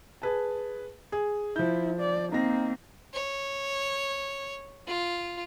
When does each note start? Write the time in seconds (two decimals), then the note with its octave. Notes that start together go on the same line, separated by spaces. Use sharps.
0.22 G#4 B4 A5
1.12 G#4
1.56 F3 E4 G6
2.00 D5
2.32 A#3 C4 D#4 A#6
3.13 C#5
4.87 F4